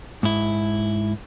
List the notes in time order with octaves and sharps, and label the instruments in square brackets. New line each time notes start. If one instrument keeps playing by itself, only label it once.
[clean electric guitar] G#2 E4